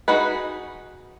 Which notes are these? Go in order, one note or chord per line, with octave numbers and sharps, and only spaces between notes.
D#4 F#4 G#4 B4